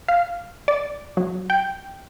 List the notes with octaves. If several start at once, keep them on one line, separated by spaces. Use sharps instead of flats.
F5
D5
F#3
G5